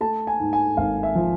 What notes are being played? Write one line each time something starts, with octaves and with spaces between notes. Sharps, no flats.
A3 A5
G#5
G#2
G#5
G#1 F5
E5
F3